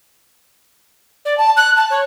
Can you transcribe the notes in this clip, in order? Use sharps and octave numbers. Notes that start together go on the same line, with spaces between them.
D5
A5
F#6
A5
C#5